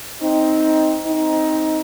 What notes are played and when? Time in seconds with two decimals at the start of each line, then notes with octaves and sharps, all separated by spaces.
0.21 C4 D#4
1.06 C4 D#4